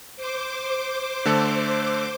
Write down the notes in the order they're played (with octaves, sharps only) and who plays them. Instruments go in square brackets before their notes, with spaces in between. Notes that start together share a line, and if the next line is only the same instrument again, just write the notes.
[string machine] C5 D6
[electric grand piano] D3 A3 A4